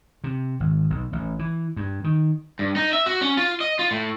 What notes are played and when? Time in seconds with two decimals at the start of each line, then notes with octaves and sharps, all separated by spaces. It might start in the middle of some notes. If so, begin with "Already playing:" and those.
0.24 C3
0.60 G#1
0.90 B1
1.13 A1
1.39 E3
1.76 G2
2.04 D#3
2.59 G2
2.76 D#4
2.93 E5
3.06 F#4
3.21 C#4
3.37 F4
3.61 D#5
3.79 F4
3.91 A2